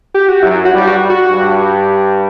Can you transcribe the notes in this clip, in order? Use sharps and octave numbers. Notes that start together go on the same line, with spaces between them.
G4
F#4
F#2 F#3 E4
F#4
G2 G3
F#4
F#4
G2 G3